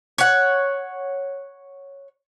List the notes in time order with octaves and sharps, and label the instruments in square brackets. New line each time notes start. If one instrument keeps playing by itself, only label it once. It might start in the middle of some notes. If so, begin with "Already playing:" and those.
[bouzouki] C#5 F#5